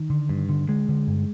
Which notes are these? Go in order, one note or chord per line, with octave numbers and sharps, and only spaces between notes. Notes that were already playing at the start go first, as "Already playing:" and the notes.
Already playing: D#3
D3
G2
D3
D3 G#3
D3
G2